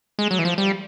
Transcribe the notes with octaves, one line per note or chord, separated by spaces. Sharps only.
G#3
F#3
E3
F3
G3